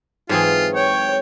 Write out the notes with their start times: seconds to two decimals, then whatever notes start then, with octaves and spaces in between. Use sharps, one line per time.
0.29 G#2 E3 F#3 C4 F4 G#4 A4
0.75 C#5 G5